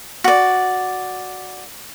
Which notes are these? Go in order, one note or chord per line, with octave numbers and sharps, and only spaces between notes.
F#4 D5